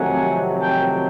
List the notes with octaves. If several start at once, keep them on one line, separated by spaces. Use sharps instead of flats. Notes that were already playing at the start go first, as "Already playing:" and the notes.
Already playing: F2 C3 D#3 F#3 A3 F#5 G#5
G5 A5